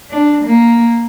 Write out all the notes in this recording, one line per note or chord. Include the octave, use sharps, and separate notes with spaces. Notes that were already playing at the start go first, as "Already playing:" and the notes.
D4
A#3